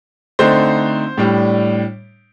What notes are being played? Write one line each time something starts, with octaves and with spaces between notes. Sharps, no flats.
D3 A3 C4 D#4 C5
A2 G3 D4